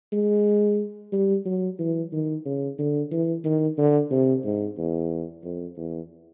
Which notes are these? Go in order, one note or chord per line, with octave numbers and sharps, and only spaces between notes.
G#3
G3
F#3
E3
D#3
C#3
D3
E3
D#3
D3
C3
G#2
E2
F2
E2